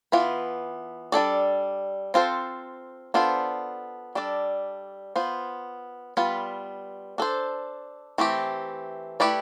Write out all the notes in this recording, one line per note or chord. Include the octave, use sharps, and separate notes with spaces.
E3 B3 F4 B4
G3 D4 A4 D5
C4 F4 A4 C5
B3 D4 F4 A4 C5
G3 D4 A4 D5
B3 F4 C5
G3 B3 F4 B4
D4 A4 C5
E3 A3 C4 G4
A3 E4 G4 B4 D5